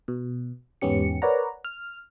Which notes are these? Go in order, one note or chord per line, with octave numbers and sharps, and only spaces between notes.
B2
E2 G#2 B3 C#4 G4 C#7
A#4 B4 C#5 D5 F#5 A#5
F6